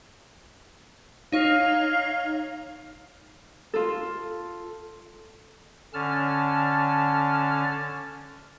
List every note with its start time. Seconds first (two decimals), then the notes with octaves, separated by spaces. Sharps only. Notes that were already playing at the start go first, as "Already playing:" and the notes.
1.32 D#4 C#5 F5
3.74 F4 A4
5.94 D3 C#4 A5 F6